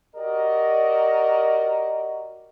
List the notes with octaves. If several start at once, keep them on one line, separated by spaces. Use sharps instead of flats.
F#4 G4 A#4 D5 D#5